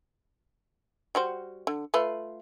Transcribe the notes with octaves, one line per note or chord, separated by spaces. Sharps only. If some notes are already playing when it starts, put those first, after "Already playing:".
G3 F#4 C5
D3
A3 F4 B4